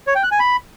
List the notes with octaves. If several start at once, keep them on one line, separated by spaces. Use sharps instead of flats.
C#5
G5
F#6
G#5
B5